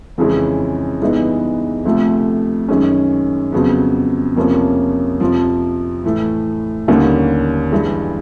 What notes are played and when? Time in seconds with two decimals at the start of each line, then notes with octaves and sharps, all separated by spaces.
0.18 F2 C#3 E3 G#3 C#4
1.01 G2 E3 G#3 B3 D#4
1.85 D2 C3 F3 A3
2.68 F#2 D#3 G#3 C#4
3.52 F2 C#3 F#3 B3
4.36 F2 C3 F3 A#3 C#4
5.20 F2 C3 F3
6.04 A2 E3 A3
6.88 D#2 D3 G3 A#3 C#4
7.72 G2 E3 G#3